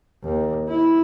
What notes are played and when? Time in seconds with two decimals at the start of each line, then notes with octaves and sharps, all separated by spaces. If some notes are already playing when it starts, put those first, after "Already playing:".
0.24 D#2
0.68 E4